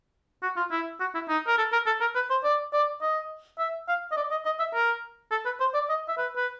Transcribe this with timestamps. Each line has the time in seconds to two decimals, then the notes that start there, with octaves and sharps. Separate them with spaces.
0.42 F#4
0.56 F4
0.71 E4
1.00 F#4
1.14 E4
1.29 D#4
1.47 A#4
1.58 A4
1.72 A#4
1.86 A4
2.01 A#4
2.15 B4
2.30 C5
2.44 D5
2.73 D5
3.01 D#5
3.59 E5
3.88 F5
4.11 D#5
4.17 D5
4.31 D#5
4.45 D#5
4.59 E5
4.74 A#4
5.31 A4
5.45 B4
5.60 C5
5.74 D5
5.89 D#5
6.08 E5
6.17 B4
6.36 B4